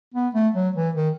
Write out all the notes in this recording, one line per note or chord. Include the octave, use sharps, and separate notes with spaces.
B3
A3
F#3
E3
D#3